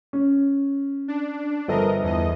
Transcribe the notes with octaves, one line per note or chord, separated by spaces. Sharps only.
C#4
D4
G1 F3 A4 A#4 D#5
E2 D#5